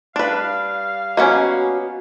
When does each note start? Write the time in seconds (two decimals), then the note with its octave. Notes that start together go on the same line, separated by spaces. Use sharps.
0.16 G3 D4 B4 F5
1.17 A#3 B3 C#4 F#4 D#5 F#5 G#5